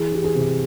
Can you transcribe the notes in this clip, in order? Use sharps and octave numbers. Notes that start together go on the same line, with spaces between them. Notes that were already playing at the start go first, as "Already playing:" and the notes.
Already playing: E3 G#4
E3 G4
G#4
C3